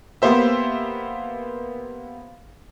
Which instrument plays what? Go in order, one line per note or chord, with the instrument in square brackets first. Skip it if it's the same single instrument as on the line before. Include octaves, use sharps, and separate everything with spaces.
[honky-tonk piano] A#3 B3 G4 C5 E5